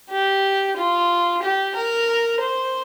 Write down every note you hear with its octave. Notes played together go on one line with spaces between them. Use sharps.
G4
F4
G4
A#4
C5